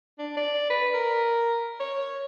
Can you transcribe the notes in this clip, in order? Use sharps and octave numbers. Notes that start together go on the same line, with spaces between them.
D4
D5
B4
A#4
C#5